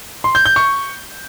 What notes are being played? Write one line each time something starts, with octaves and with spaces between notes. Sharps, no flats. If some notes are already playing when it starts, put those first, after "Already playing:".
C6
G6
G6
C#6